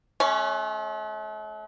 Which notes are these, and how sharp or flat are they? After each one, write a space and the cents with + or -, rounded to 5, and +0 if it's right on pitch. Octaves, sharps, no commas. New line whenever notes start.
A3 -45 C#4 +0 C#5 +10